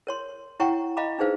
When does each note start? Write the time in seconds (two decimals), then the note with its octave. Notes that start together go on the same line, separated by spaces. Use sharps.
0.07 A#4 C#5 C6
0.60 E4 C#5 F#5 G5 A#5 C#6
0.97 D#5 F5 A#5 B5 D6
1.18 D4 D#4 G#4 B4 C5 F5